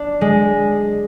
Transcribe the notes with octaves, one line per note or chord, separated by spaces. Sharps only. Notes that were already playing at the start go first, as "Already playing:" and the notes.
Already playing: D4
G#3